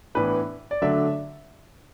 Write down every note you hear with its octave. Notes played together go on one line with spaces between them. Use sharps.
A2 E3 B3 D4 B4
D5
D3 F#3 A3 D4 E5